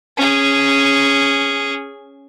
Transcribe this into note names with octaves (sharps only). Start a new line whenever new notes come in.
C#4 G#4